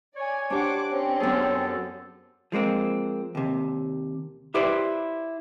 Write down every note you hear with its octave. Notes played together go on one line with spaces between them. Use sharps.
C#5 D5 G#5
D4 G4 C5 F#5 D6
C4 C#4
F#2 B3 G#4 A4
F3 G#3 A#3 C4
D#2 C3
E4 G4 B4 C5 D5 E5